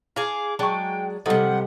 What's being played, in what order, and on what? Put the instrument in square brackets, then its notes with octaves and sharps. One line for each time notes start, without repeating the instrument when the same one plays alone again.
[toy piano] E4 [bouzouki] G#4 F5 [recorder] D6
[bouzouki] F#3 G#3 D4 [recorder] G5 [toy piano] A5 C#6
[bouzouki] C3 F3 [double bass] G3 [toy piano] E4 A4 D#5 [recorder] F#5